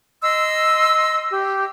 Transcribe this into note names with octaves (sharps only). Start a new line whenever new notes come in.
D#5 C6 E6
G4